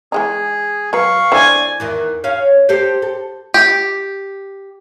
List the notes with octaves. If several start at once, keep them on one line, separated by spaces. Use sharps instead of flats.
E3 G#3 D#4 G#4
F#3 B4 F5 C#6
D3 E4 C5 D5 G#5
E2 D#3 E3
C#4 F5
G4 A4 C5
A4
G4